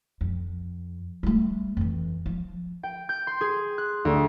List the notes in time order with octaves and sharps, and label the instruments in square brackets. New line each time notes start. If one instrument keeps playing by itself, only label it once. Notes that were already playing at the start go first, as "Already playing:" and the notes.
[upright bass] F2
G3 A3
F2 E3
F3
[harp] G5
G6
C6
G#4
F#6
D2